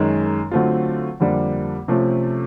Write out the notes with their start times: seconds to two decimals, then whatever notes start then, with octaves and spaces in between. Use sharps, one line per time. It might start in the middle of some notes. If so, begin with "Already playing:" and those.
Already playing: F#2 D#3 G#3
0.51 D3 F#3 A3 C4 F4
1.20 F2 D3 G3 A#3 D4
1.88 C3 F3 A3 C#4